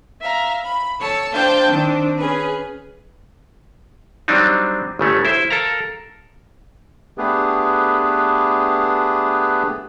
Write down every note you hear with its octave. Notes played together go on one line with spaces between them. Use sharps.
E5 F5 A#5
B5
A4 C#5 A5 E6
D4 C5 F5 G5 A5 G6
D#3 C4 D4
C#4 G#4 B4
F#3 G3 C4 D4 D#4
G1 C#3 A3 C#4
E4 C5 E5
A4 A#4 F5 A#5
A3 B3 D4 G4 G#4 B4